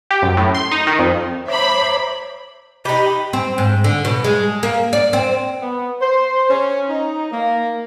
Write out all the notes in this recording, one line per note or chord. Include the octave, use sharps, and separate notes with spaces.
G4
F#2
A2
C6
D#4
D#3
F2
C5 C#5 E5 A#5 B5 D6
D#4 G4 B5
C4
G#2
D3
B2
G#3
A#3
D5
C4
B3
C5
C#4
D#4
A#3